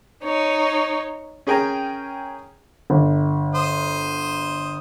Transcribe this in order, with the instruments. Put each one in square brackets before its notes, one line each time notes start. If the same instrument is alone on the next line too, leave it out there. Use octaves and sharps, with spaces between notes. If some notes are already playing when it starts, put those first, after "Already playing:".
[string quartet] D#4 C#5
[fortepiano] C#4 G#4 A#4 G5 G#5 A#5
[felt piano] G1
[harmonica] C5 D#6